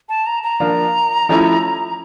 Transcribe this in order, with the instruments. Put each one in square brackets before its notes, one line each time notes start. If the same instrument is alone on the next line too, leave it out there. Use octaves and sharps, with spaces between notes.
[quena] A5
A#5
A#5
[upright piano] F3 A#3 D4 F4
F3 A3 C#4 E4